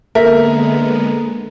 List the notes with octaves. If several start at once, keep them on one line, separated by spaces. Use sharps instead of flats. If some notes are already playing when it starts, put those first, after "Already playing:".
D3 G#3 A#3 B3 A4 A#4 E5